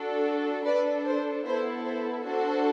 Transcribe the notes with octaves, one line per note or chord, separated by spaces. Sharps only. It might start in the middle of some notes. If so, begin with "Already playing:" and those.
Already playing: D4 F#4 A4
D4 A4 B4 D5
C5
B3 E4 A4 C5
C5
D4 F#4 A4 C5